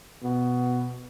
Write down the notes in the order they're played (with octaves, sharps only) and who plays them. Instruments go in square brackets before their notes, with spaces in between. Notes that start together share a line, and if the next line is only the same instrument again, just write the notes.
[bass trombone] B2